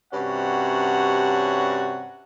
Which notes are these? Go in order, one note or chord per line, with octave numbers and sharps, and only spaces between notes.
G2 C3 C#4 F#4 F#5